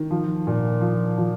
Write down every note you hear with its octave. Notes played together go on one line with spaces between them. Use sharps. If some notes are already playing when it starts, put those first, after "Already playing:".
Already playing: D#3
F3
A#2
F3
F3